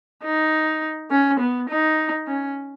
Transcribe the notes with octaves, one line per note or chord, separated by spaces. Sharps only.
D#4
C#4
B3
D#4
C#4